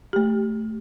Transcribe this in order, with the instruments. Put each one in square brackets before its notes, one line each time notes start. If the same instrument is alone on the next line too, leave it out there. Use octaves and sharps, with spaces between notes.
[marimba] A3 G4